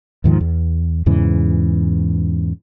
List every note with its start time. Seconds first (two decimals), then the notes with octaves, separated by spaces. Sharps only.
0.24 D#2 G#2 D#3 F3
0.40 E2
1.06 E2 G#2 C#3 E3